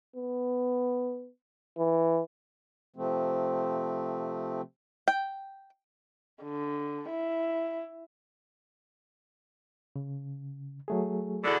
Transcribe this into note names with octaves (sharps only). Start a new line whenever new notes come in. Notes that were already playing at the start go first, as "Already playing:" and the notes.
B3
E3
C3 F3 A3 C4
G5
D3
E4
C#3
F#3 A3 G#4
E2 B2 D3